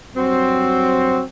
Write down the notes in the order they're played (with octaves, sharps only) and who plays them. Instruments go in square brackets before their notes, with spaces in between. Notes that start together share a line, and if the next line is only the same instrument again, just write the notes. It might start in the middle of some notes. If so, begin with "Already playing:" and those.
[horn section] G2 F#3 C4 F#4